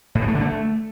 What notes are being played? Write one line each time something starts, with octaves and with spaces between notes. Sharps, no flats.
A2
E3
A3
D3
A3